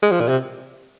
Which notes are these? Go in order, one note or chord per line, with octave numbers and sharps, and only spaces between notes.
G#3
F3
A#2
C3